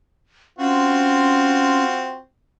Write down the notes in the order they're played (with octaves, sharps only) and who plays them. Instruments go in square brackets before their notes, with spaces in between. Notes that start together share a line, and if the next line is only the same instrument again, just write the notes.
[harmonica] C4 F4 F#4 [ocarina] C#4